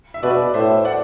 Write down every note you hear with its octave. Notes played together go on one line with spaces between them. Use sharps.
E5
B2 B4 D5
A2 C5 E5
D5 F#5